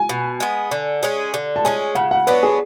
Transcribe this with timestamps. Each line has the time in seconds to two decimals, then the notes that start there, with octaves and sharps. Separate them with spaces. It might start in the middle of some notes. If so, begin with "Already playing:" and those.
Already playing: G#5
0.09 B2
0.40 G#3 B3
0.71 D3
1.03 G#3 C#4 G#4
1.34 D3
1.56 A5
1.65 G#3 C#4 G#4 G#5
1.95 C#3 F#5
2.11 F#5
2.27 F#3 B3 D4 B4
2.43 G#4